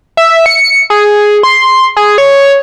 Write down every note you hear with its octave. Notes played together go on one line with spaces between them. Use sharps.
E5
C#7
G#4
C6
G#4
C#5